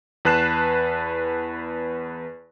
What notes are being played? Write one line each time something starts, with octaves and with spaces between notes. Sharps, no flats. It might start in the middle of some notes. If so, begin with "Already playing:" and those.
E2 B4 A5 F#6 C7 E7